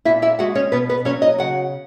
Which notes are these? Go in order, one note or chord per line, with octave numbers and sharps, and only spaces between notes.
A#2 E4 E5
E4 E5
G#3 F#4 F#5
C#4 C#5
B2 B3 B4
B3 B4
F#3 C#4 C#5
D#4 D#5
C#3 F#4 F#5